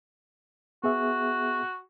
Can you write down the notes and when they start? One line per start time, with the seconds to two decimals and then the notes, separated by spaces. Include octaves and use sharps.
0.84 B3 F#4 G#4 E5